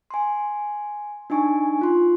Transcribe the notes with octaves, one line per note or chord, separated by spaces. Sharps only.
G#5 C6
D4 D#4 G#5 C#6
F4 C6